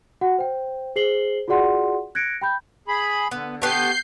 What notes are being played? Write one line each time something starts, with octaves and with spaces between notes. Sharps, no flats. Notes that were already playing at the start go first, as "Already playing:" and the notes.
F#4 F#5
C5 G5
G#4 C5 C7 F#7 G7
F4 F#4 G#4 D5 F#5 C6
F#6 G#6 A#6 C#7 D7
G5 B5 G6
G#4 B5
D3 B3
A3 B3 G4 G6 C7